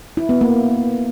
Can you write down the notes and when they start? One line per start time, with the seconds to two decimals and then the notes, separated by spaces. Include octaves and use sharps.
0.17 E4
0.29 B3
0.41 A#3